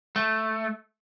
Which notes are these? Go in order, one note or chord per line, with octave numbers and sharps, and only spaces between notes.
A3